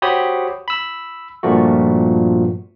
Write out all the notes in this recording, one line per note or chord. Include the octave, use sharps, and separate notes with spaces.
F#4 G4 C5 C#5 B5 D#6
B5 E6
G2 A#2 F3 A3 F#4